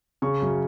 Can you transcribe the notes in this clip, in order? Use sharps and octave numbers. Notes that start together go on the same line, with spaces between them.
C#3 C#6
F#2